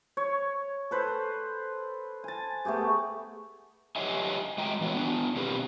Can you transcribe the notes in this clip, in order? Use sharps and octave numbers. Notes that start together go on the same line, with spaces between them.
C#5
A4 B4 C5
G#5 A5
A3 B3 G4 G#4
G4 B4 C#5 D#5 E5 G#5
G#3 D#5 G5 A#5
E3 B3 F#4 C#5
B3 D4
B2 D3 C4 G4 A#4 B4